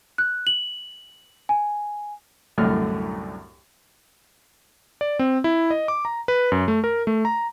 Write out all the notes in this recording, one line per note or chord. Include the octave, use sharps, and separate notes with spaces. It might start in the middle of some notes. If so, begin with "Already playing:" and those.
F#6
F#7
G#5
C2 F#2 A2 D3 A3 F6
D5
C4
E4
D#5
D6
A#5
B4
F#2
A3
A#4
A3
A#5